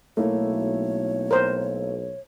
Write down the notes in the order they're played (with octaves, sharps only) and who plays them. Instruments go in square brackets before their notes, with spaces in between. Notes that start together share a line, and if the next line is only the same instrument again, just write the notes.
[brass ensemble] B1 [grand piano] A3 A#3 E4 [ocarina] C#5
[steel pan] A#4 C5